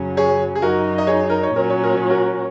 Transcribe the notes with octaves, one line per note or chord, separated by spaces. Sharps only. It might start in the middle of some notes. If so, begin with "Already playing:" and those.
Already playing: F#2 C#3 F#3 C#4
G#4 C#5
G#4
F#2 F#3 D#4 F#4 A#4
D#5
G#4 C#5
A#4
C#5
A#2 F#3 C#4 A#4
C#5
A#4
C#5
F#4 A#4